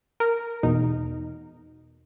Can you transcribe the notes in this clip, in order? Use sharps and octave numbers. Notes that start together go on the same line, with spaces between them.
A#4
E2 B2 D#4